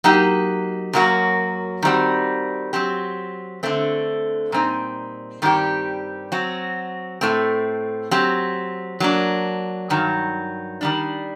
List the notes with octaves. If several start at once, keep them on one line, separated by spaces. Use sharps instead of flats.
F#3 A#3 D#4 G4
F#2 F#3 A#3 F#4
D#3 G3 C4 F#4
F#3 C4 G4
D3 A3 C4
A#2 G3 C4 D#4
G2 D#3 G3 C4 G4
F#3 C4 F#4
A2 A3 C4
F#3 C4 G4
F#3 A#3 D4
G2 D#3 F#3
D#3 G3 D4